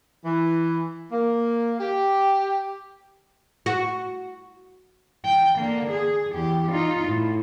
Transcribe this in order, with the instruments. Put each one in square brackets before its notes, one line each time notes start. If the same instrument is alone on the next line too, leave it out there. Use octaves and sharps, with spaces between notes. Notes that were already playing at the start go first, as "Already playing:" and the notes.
[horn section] E3
A#3
G4
[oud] F#4
[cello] G5
D3 A#3
G#4
E2 G4
D#4 F4
A2